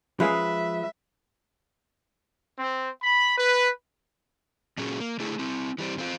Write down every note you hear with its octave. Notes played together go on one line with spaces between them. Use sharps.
F3 G#3 C#4 G#4 B4 E5 F5
C4
B5
B4
A#2 F#3 C#4 G#4
A#3
D3 A3 E4 G#4
C4 E4
E3 G3 C4
E2 C4 F4